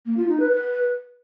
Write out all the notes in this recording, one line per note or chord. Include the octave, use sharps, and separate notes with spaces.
A#3
F4
D#4
B4
B4